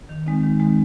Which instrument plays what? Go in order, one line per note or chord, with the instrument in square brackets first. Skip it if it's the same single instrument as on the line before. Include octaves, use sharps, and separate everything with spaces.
[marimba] D#3
G#3 C4 D#4
D#3
G#3 C4 D#4